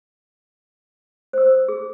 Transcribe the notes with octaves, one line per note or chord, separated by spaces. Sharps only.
C5 E6
G#4